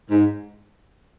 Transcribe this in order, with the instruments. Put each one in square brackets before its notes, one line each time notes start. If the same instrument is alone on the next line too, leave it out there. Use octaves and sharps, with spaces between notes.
[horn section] G#2